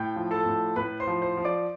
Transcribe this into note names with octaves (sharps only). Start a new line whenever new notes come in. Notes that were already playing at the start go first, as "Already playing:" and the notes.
Already playing: A2 G5 G6
F3
A4 A5
A2
A2 B4 B5
C5 C6
F3
C5 C6
F3
D5 D6